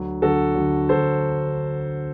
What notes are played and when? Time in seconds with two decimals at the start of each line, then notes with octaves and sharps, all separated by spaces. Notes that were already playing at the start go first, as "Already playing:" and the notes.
Already playing: D2 D3 F#3
0.22 D2 D3 F#3 F#4 A4
0.55 D2 D3 F#3
0.89 D2 D3 F#3 A4 C5